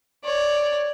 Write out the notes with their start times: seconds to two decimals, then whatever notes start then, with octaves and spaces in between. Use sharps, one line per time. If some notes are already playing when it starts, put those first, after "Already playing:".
0.24 C#5 D5